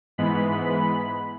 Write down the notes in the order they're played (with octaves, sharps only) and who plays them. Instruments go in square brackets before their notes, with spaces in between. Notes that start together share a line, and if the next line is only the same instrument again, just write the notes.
[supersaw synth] G#2 E3 G#3 B3 B5